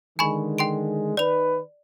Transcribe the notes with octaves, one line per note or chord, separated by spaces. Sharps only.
D3 D#3 G#3 G#5 B5 C#6
G5 C6 D7
D#3 B4 D5 F7